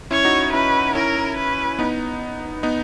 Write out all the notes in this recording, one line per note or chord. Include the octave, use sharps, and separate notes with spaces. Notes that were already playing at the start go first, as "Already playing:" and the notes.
C#4 E4 C#5
D#4 F#4
C#4 E4 B4
C#4 E4 A#4
B4
B3 D#4
B3 D#4